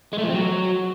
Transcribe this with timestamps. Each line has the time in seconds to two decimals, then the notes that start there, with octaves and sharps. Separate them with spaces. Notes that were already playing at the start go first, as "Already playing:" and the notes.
0.13 G#3
0.18 A3
0.23 F3
0.29 C4
0.34 F#3